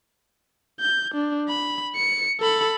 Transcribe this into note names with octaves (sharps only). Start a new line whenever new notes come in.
G6
D4
B5
C#7
A4 B5